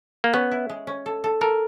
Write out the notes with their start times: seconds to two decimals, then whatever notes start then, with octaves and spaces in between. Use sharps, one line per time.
0.24 A#3
0.33 B3 C#4
0.51 E4
0.69 G#3
0.87 C#4
1.06 A4
1.24 A4
1.41 A4 A#4